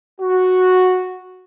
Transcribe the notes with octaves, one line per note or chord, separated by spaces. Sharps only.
F#4